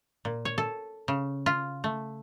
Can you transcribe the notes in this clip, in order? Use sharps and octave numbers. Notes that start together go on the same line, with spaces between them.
A#2
C#5
A4
C#3
F4
A3